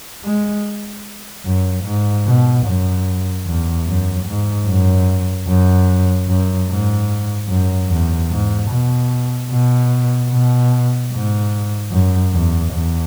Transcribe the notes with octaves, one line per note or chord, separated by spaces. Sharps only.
G#3
F#2
G#2
B2
F#2
E2
F#2
G#2
F#2
F#2
F#2
G#2
F#2
E2
G#2
B2
B2
B2
G#2
F#2
E2
E2